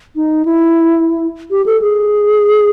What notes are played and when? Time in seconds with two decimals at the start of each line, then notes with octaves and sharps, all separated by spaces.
0.16 D#4
0.45 E4
1.51 G4
1.66 A4
1.81 G#4